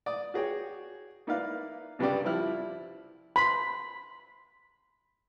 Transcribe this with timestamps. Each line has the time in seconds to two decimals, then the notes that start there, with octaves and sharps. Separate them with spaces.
0.06 D5 D#6
0.34 F#4 G#4 C#5 G5
1.27 A#3 D#4 E4 B4 D5 F5
1.99 C2 G2 C#3 G4 D5
2.24 F3 G3 E4 F6
3.36 B5 C6